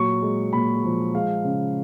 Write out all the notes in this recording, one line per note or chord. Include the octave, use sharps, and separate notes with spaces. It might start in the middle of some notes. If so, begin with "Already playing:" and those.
Already playing: A#2 F#3 C#6
G#3
A#2 B5
F3
G#3 F5
C#3